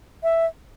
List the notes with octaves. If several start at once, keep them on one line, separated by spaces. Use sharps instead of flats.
E5